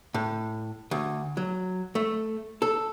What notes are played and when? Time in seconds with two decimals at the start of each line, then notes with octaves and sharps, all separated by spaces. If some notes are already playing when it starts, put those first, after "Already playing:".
0.14 A2
0.91 D2
1.37 F#3
1.95 A3
2.62 A4